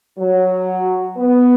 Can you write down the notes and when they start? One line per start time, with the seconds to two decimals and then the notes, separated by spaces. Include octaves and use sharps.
0.19 F#3
1.17 B3